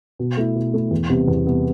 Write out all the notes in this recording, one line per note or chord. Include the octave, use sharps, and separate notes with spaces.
B2
A3 E4
B2
A3 E4
E2
C3 G3 B3
E2
C3 G3 B3